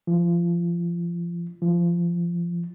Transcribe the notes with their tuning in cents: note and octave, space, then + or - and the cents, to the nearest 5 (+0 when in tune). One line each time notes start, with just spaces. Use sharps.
F3 -25
F3 -20